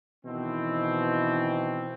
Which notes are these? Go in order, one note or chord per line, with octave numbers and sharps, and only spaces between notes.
B2 D#3 E3 C4